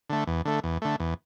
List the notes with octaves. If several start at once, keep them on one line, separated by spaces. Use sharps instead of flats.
D3 A3
E2
D3 A3
E2
D3 A3
E2